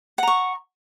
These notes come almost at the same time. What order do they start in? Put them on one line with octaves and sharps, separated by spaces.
F#5 A#5 C#6